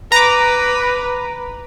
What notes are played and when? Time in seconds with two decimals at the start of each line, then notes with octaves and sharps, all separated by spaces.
0.12 B4 A#5 D6